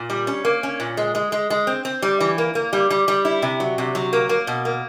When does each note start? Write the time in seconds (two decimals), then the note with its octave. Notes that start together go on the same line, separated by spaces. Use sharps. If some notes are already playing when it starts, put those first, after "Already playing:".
Already playing: A#2
0.10 G3
0.27 C#4
0.45 A#3
0.63 C#4
0.80 A#2
0.97 G#3
1.15 G#3
1.32 G#3
1.50 G#3
1.67 C4
1.85 C4
2.02 G3
2.20 E3
2.38 A#3
2.55 A#3
2.73 G3
2.90 G3
3.08 G3
3.25 E4
3.42 C3
3.60 F#3
3.78 C3
3.95 F#3
4.13 A#3
4.29 A#3
4.47 B2
4.65 A#3